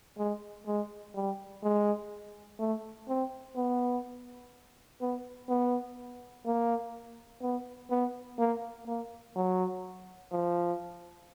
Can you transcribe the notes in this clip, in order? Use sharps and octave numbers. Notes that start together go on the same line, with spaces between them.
G#3
G#3
G3
G#3
A3
C4
B3
B3
B3
A#3
B3
B3
A#3
A#3
F#3
F3